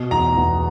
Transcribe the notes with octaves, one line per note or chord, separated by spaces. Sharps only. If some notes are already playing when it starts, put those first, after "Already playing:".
Already playing: B2
E2 A#5
E2